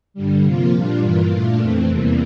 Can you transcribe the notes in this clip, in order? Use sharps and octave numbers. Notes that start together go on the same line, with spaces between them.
G2 D3 G3
C3 F3 A#3 F4
A#2 G3 D4 F4
G2 E3 A#3 F4
A#2 A3 D4 F4
F2 E3 A3 C4
E2 C3 E3 G3 A#3